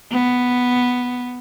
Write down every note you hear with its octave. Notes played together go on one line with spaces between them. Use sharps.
B3